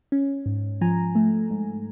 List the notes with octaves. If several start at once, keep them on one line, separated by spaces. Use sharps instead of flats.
C#4
G#2
F3 G#5 A#5
A3
G#2